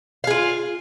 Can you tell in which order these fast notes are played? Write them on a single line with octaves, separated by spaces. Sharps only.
F5 G#4 F4